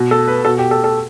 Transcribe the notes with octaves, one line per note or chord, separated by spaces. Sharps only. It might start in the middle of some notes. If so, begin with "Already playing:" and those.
Already playing: B2
A4
B4
B2 A4
G4
A4
A4